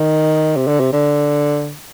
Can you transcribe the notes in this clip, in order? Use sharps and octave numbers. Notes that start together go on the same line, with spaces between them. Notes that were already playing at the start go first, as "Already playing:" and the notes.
Already playing: D#3
C3
D3
C3
D3